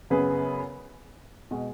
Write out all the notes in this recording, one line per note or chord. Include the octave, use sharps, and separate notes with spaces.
F#2 C#3 B3 G#4 B4
B2 G#3